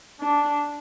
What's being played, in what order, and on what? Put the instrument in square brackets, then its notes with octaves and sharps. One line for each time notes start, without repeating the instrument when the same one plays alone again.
[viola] D4